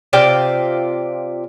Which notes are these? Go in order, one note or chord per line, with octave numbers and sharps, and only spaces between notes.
C3 F4 D5 G5